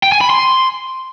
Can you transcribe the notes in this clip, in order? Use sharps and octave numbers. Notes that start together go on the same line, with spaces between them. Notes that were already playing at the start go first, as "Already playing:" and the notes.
G5
G#5
B5
C6